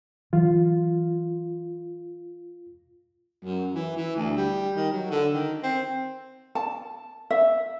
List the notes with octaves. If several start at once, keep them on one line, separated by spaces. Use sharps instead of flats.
E3 F#3 F4
F#2
E3
E3
D2
G3
D#3
F#3
D3
D#3
C4
A5
E5